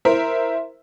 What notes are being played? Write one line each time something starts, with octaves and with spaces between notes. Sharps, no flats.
E4 A#4 C5 E5